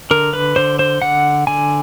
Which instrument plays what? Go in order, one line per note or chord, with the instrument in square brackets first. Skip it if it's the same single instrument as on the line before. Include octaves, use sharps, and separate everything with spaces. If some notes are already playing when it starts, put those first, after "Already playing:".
[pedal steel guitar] D3 A#4
B4
D3 C5
C5
D3 F#5
D3 G#5